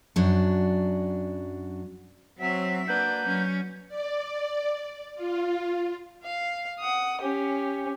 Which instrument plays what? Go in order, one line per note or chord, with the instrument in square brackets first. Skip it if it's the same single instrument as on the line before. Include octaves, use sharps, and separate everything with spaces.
[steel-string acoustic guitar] F#2 F#3 D4
[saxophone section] F#3 [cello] C4 E5
[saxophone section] A#3 F#4 B4 [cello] D4 [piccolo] G6
[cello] F#3 C#4
[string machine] D5
F4
[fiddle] F5
F#5 D#6
C#4 G4